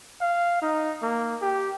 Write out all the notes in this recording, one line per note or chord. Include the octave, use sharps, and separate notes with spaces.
F5
D#4
A#3
G4